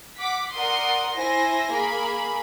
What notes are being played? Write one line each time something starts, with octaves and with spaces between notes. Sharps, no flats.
F#5 D6 B6
A#4 D5 F#5 C6 D#6
E4 C5 G#5 A#6
A#3 G#4 B5